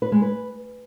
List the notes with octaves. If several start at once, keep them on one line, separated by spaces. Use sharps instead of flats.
B4
G#3
B4